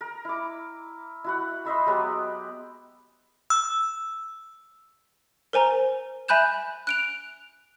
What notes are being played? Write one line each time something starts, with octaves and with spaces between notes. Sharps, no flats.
A#4
E4 D6
E4 F#4 F#5
C5 D#5 E5 B5
F#3 G#3 B3 G4
E6
A#4 C5 G#5 A#5
E5 G#5 B5 F#6 G6 E7
F#6 D7 F7